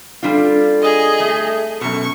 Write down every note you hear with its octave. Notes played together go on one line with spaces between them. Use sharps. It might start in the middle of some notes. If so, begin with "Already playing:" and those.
G3 C4 D4 F4 A4 F5
G#4 D#5
A3
F#2 B2 C#6